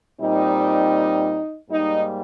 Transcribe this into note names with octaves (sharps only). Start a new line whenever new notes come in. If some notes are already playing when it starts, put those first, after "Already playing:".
A#2 G3 C4 D#4
G#2 G3 A#3 D#4